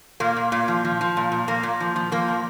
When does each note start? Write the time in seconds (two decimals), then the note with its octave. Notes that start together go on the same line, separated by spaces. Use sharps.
0.20 A#2 A#3
0.36 A#2
0.52 A#2
0.68 F3
0.85 F3
1.01 F3
1.17 A#2
1.32 A#2
1.48 A#2 A#3
1.63 A#2
1.80 F3
1.96 F3
2.12 F3 A#3
2.28 A#2